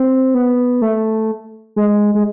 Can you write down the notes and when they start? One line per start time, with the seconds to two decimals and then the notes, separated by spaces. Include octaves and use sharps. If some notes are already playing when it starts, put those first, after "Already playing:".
Already playing: C4
0.35 B3
0.82 A3
1.76 G#3
2.15 G#3